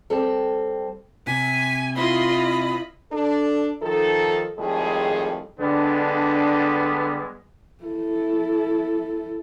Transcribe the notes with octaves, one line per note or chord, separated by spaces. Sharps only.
G3 C4 A4
C3 G#5 B6
E4 F4 D#5 B5 C6
E4
D4 A4
D#3 F3 D#4 A4
F2 A2 D#3 G3 G#3 G#4
D3 G3 G#3 B3 D4
E4 A4